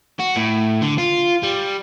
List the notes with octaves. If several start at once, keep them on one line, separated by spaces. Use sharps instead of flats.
F#4
A2
D3
F4
G3